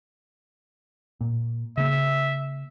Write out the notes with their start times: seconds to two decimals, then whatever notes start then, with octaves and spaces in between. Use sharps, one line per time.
1.21 A#2
1.77 C#3 A#3 E5